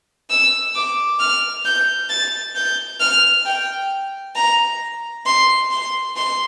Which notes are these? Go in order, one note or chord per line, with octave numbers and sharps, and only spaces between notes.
E6
D6
F6
G6
A6
G6
F6
G5
A#5
C6
C6
C6